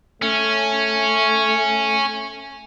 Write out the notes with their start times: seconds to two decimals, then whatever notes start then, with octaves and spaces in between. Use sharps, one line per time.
0.22 A3 C#4